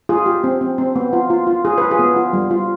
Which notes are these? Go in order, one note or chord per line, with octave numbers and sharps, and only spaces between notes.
F4 G#4
G4
C4
C4
C4
B3
F4
F4
F4
F4 G#4
F4 B4
G#4
B3
F4
G3
F4